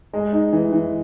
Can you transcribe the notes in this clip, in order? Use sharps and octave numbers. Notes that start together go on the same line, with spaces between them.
G#3
D#4
E3
E3